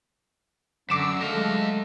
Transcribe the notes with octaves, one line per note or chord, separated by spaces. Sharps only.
F#2 D3 D6 E6 E7
F#3 G#3 A3 D#5 F5